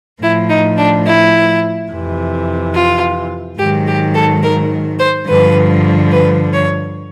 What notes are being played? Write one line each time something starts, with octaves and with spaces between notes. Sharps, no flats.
A2 F3 E4
D#4
D4
E4
F2 C3 E3
F4
G#2 D#3 F#3 G4
G4
A4
A#4
C5
G2 D3 F3 B4
B4
C#5